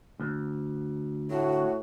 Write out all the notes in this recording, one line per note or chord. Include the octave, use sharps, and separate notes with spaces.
D2
A2 F#4